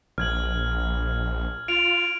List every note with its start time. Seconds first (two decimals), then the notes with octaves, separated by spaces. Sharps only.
0.18 A#1 F6 G#6 F#7
1.68 F4 D7 F7